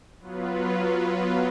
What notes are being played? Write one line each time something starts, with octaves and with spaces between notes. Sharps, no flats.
F#3 B3 F4 B4